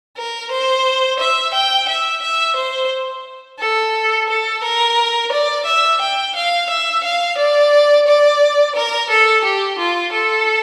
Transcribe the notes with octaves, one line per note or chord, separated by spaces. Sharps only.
A#4
C5
E5
G5
E5
E5
C5
A4
A4
A#4
D5
E5
G5
F5
E5
F5
D5
D5
A#4
A4
G4
F4
A4